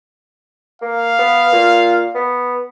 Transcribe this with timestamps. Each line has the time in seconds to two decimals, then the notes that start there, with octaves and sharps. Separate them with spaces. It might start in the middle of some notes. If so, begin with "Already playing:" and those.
0.82 A#3 F5
1.19 B3
1.53 A#2
2.15 B3